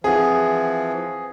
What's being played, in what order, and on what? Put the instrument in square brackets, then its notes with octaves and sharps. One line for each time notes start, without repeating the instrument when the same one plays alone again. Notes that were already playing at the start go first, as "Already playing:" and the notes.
[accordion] E3 F3 [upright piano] C4 F#5 [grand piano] G#4